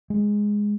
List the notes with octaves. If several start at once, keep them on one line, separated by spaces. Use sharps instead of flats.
G#3